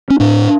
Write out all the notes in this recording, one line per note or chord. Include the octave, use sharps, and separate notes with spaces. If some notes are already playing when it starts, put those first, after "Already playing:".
C#4
A2 D4